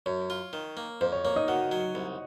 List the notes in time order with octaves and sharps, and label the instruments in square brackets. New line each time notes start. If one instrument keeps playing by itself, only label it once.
[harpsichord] F#2 [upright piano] C#5
[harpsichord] F4
D#3
A#3
[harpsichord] F2 [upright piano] C5
[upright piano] C#5
[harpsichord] A#3 [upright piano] C#5
[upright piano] D#4 D#5
[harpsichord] D#3 [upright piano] F#4 F#5
[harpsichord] F#3
C2